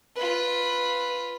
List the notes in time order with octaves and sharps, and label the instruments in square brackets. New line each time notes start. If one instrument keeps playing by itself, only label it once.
[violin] F4 B4